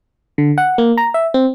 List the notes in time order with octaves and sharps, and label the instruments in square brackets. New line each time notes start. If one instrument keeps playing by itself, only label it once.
[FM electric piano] D3
F#5
A#3
A#5
E5
C4